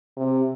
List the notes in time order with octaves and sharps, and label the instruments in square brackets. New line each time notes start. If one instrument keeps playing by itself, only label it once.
[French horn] C3